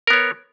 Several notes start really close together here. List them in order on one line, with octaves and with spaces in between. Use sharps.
A#4 B3 C#5